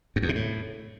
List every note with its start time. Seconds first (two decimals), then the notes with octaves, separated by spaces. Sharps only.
0.16 F#2
0.22 E2
0.29 C3
0.35 A2